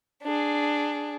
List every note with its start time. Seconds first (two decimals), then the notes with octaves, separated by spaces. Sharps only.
0.23 D4 G#4